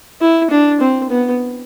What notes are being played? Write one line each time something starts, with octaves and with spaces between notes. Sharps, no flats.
E4
D4
C4
B3